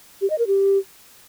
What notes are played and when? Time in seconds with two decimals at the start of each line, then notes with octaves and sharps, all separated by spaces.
0.21 G4
0.30 D#5
0.39 A#4
0.47 G4